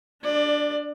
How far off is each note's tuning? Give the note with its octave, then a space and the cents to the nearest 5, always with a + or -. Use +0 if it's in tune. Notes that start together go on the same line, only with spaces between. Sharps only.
D4 +0 D5 +20